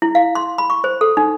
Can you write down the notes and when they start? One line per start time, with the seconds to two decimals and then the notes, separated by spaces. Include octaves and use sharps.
0.02 E4
0.15 F5
0.35 C6
0.58 B5
0.70 C#6
0.84 C5
1.01 A4
1.17 D#4